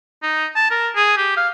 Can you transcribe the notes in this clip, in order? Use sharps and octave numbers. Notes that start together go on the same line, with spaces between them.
D#4
A5
A#4
G#4
G4
F5